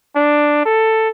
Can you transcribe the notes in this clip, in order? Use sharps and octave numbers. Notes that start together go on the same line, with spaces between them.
D4
A4